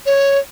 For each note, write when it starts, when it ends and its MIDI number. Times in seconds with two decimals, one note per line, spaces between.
0.06 0.39 73